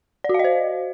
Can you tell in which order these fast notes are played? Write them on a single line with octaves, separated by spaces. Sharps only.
D5 F#4 F5 D#5 C5